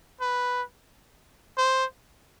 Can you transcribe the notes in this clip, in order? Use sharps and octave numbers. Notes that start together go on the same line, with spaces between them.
B4
C5